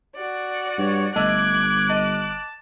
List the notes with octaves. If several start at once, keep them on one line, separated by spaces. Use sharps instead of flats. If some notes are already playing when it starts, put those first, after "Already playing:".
F#4 D5
G2 C#5
G1 A3 D#5 D6 F#6 G#6
D#5 A5